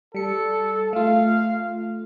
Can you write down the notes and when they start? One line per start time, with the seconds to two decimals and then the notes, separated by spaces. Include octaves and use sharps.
0.15 G3 A4 C#7
0.93 A3 F4 F5